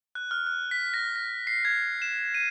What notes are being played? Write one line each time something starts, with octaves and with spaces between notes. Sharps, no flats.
F#6
F6
F#6
B6
A#6
A#6
C7
G#6
E7
D#7